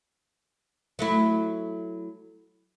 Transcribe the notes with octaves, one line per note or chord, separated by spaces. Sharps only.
F#3 A3 E4